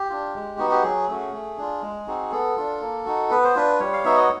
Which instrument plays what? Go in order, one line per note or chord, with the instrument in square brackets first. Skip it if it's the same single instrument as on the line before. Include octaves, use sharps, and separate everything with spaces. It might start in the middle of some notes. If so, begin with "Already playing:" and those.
Already playing: [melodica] G4
D4 F4
G#3
B3 D#4 F#4
G4
F#3 G#4
A3 C#4 F#4
A3
D4 F4
G#3
C4 D#4 F#4
B3 A4
D4 F4
A#3
D#4 F#4
B3 B4
C5
D4 F4 B4
G3 C#5
F5
B3 D#4 F#4 E5
D#5